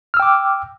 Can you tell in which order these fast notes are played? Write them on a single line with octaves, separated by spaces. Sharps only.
F6 E6 G5 D6